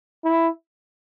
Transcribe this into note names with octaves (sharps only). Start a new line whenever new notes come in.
E4